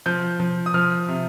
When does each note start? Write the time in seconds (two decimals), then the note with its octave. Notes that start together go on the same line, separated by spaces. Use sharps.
0.06 F3 G6
0.40 F3
0.66 D#6
0.74 F3 F6
1.08 C3